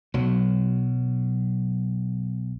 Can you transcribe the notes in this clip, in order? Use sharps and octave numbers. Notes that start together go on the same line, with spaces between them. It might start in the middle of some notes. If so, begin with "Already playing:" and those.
B1 F#3